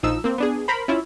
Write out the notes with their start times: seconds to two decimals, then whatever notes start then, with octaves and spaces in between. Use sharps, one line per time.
0.03 A#1 F3 D#4 E6
0.24 A#3 C4
0.38 B3 D4 G#4
0.68 A#4 C5 B5
0.88 C#4 E4 F4